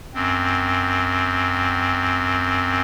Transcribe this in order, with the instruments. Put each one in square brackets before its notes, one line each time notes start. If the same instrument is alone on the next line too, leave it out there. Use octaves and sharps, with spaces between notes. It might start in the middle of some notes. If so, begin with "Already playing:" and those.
[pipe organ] F#2 C4